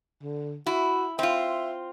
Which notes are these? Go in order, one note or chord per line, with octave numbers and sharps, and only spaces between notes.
D3
E4 F#4
C4 F4 E5